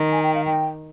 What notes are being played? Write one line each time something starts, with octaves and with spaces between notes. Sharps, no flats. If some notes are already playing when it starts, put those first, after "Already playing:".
Already playing: D#3
G#5
G5
F5
G5